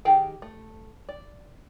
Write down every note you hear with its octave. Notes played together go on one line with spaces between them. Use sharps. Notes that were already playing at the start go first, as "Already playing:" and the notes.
D#3 G4 G#4 G5
A3
D5